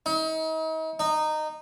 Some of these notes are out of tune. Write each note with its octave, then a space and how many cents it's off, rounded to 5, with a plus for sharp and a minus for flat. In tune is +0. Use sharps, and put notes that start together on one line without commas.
D#4 +40
D#4 -15